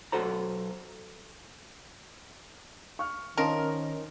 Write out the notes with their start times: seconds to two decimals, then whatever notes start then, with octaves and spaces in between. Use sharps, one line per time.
0.12 B1 C#3 F#4 A4 C5 A#5
2.99 C#6 F6
3.38 D#3 F3 C#4 A#4 D#5